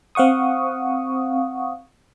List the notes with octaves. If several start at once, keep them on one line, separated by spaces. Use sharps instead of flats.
C4 F5 F#5 C#6 D#6